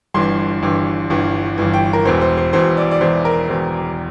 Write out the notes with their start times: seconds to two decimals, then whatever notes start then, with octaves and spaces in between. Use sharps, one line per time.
0.14 G1 G2 E3 C6
0.62 G1 G2 E3
1.10 G1 G2 E3
1.58 G1 G2 E3
1.74 G5
1.93 A#4
2.05 E1 E2 E3 C5
2.21 C5
2.37 C5
2.53 E1 E2 E3 C5
2.77 D5
2.91 D5
3.01 E1 E2 E3 C5
3.25 A#4
3.49 E1 E2 E3 C5